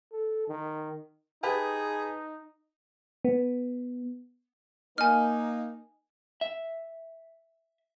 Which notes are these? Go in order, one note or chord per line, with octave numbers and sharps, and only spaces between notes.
A4
D#3
D#4 G4 G#4 B4 A5
B3
A#3 D#4 G#5 F6
E5